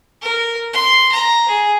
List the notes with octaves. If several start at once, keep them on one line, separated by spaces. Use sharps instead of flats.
A#4
C6
A#5
G#4